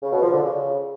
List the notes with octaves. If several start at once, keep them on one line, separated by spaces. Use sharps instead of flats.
C#3
B2
F3
D3
C#3